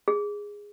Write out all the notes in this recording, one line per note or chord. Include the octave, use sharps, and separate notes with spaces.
G#4